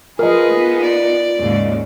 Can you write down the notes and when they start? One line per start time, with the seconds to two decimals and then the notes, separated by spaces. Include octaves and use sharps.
0.19 F3 F4 G#4 A#4 B4 D#5
0.51 B3 D#4
0.83 D5
1.37 D#2 G#2 C#3